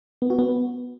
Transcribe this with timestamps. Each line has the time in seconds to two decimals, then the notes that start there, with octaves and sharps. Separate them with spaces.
0.22 B3
0.30 F#4
0.39 B3